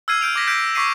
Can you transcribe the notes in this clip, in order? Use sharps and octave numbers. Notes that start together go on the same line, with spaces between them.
E6 F6 G#6 C7 D#7
F6 G6 D7 F7
D6 A#6 B6
F6 G6 G#6 A#6 B6 D7
C#6 D6 B6 C7 D#7